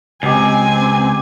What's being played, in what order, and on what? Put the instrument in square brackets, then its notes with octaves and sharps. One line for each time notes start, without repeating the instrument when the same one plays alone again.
[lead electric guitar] C#2 [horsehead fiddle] C4 G#5 [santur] G4 D#5